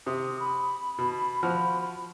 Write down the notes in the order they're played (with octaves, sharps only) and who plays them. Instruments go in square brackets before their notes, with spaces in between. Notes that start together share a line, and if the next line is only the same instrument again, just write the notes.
[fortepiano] C3 [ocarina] D#6
[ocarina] B5
[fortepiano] B2
F3 F#4 F6